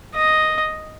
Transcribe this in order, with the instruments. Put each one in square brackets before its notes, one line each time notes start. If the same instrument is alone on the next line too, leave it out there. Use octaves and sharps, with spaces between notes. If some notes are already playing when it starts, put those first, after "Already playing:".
[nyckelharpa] D#5